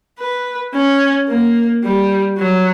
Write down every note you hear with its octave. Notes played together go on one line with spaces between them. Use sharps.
B4
C#4
A#3
G3
F#3